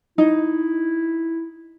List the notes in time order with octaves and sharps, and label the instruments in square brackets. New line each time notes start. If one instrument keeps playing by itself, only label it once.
[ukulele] D#4 [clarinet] E4